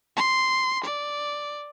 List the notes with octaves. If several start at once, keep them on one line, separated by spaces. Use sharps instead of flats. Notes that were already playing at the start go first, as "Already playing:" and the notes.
C6
D5